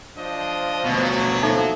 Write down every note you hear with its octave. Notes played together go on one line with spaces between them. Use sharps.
F3 D4 C5 D#5
D2 B2 F#3
F3 D#4 A4 E5